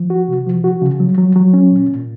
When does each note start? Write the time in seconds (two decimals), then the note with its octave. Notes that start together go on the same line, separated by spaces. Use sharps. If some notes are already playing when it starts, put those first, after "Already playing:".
Already playing: F3
0.10 F#4
0.28 C3
0.47 F3
0.64 F#4
0.82 C#3
1.00 F#3
1.18 F#3
1.36 F#3
1.54 C#4
1.71 A#2
1.89 A#2